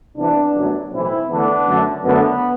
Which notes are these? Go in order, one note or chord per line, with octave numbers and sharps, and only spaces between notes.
C2 C3 E3 B3 D4
G1 F#2 F#3 A3
B1 A2 E3 C4 E4
E2 D3 A3 B3 D4
F#2 D3 A3
F#2 D3 A3 B3